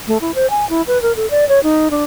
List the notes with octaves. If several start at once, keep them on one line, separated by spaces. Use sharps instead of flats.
A3
E4
C5
G#5
E4
B4
A#4
A4
D5
C#5
D#4
D4